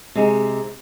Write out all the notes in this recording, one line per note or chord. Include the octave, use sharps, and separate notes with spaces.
C3 G#3 D#4